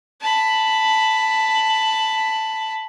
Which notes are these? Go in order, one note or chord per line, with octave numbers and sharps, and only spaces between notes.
A5 B5